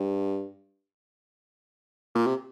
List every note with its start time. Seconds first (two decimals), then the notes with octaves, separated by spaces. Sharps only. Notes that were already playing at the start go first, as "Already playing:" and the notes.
Already playing: G2
2.15 A#2
2.26 C3